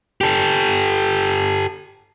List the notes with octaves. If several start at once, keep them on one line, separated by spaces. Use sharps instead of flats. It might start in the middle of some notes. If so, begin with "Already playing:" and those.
G4 A4